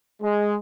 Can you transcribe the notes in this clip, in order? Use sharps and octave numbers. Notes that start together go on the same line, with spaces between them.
G#3